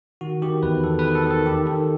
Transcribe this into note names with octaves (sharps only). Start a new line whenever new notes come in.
D#3 F#4
D#3 G4
E2 B4
E2 A4
B4
D#3
A4
D#3
A4
D#3 G4
D#3 A4